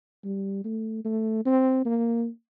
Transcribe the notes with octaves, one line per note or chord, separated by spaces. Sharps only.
G3
A3
A3
C4
A#3